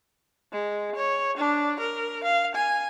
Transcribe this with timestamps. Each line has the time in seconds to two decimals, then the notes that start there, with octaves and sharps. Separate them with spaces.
0.52 G#3
0.96 C#5
1.37 D4
1.80 A#4
2.24 F5
2.55 G#5